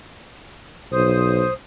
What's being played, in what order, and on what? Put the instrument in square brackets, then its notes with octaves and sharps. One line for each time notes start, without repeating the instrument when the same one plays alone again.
[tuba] B1 [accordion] C5 D#6